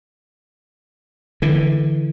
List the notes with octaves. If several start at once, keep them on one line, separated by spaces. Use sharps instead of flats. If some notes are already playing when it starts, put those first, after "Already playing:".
D3 E3